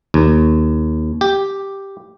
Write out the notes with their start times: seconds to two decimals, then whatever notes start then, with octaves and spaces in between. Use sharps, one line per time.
0.14 D#2
1.21 G4